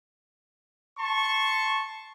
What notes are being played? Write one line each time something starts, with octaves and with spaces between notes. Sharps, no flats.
A5 C6 C#6